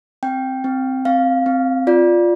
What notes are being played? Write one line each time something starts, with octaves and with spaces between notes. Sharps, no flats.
C4 G5
C4
C4 F5
C4
F4 D5